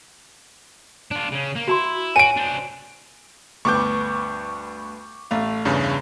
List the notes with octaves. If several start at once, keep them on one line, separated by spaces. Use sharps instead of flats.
D4 F4
C#3 C#4
A#3
E4 F#4 A#5 C6
F#4 C#5 G#5 D7 D#7
D4 C5
D2 G2 B3 C#6 D6 G6
A1 A3 F5
E2 G2 C#3